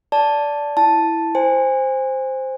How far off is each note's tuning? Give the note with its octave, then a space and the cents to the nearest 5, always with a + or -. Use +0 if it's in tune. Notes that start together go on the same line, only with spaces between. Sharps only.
D5 -15 A5 +0
E4 +0 A5 +0
C5 +0 G#5 -30